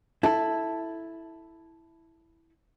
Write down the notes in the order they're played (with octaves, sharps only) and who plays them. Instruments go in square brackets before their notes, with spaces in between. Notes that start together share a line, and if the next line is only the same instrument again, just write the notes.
[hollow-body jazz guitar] E4 A4